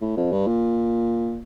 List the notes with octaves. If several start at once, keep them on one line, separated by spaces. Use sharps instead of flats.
A2
F2
G2
A#2